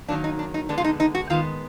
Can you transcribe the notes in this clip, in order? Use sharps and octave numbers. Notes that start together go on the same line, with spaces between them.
D#3 F#3 A#3 D4
D#4
D4
D#4
D3 G#3 B3 D4
F4
D#4
D#4
F#4
D#3 G#3 B3 F4